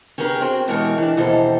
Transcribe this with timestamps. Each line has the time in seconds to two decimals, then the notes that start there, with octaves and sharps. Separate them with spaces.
0.18 C#4 G4 G#4 A#4 B4
0.41 C4 F#4 G5
0.68 B2 E3 G#3 G4 A#4 C#5
0.98 E3 D4
1.17 D#2 B2 E3 G4 A4 C5